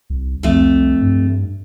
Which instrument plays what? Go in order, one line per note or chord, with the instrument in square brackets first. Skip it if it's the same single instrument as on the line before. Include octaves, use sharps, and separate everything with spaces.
[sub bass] C2
[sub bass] C2 [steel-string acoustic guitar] F2 A3
[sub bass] G2